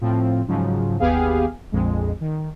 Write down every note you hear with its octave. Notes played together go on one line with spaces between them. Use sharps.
A2 F3 C4
G#2 C#3 F3 F#3
G1 D#2 B3 G4 G#4 F5
A#1 F2 G#3
D#3